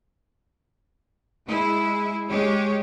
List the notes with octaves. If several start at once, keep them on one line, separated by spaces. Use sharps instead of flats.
G#3 E4
G#3 G4 C#5